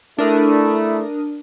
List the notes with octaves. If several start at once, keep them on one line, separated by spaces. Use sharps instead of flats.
A3 D4 E4 A#4 D#6